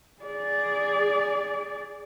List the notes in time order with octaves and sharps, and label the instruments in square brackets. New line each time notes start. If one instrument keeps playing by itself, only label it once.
[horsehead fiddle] G#4 D5